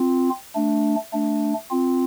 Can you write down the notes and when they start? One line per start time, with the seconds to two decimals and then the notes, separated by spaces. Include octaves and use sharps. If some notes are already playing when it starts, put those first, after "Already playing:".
Already playing: C4 F4
0.55 A3 D4
1.13 A3 D4
1.71 C4 F4